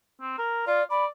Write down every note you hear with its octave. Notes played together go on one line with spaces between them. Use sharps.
C4
A#4
F4 D5
D5 B5